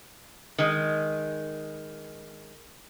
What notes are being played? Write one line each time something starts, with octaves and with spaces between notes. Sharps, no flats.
D#3 G#3